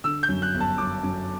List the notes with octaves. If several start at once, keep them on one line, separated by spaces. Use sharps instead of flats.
D3 E6
G6
F#2
F#6
G1
A5
F#2 D6
F#2